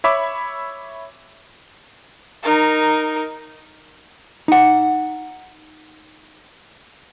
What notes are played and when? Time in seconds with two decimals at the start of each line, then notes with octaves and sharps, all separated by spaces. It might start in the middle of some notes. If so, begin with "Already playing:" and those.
0.04 C#5 E5 B5 D6
2.43 D#4 A#4
4.48 D#4 F#5